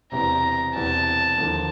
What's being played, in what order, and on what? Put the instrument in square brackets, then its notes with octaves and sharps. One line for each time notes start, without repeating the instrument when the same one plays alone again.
[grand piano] E1 E2 C3 [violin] A#5
[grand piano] E1 E2 C3 [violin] A5
[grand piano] D#2 D3 F3 A#3